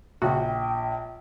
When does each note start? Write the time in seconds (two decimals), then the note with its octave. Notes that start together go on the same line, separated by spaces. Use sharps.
0.22 A#1 C#3 F#4 G5